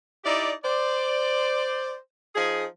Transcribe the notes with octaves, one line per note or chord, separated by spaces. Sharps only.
D#4 E4 G4 D5
C5 D5
F3 D#4 G#4